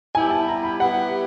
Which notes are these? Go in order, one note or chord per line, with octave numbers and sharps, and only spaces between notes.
G3 B3 E4 G4 G#5
A5
A#5
B5
G3 B3 E4 G4 F#5